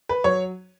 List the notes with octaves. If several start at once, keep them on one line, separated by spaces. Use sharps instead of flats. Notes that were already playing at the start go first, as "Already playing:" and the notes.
B4
F#3 C#5